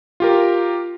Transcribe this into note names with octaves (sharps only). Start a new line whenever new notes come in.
F4 G4 A#4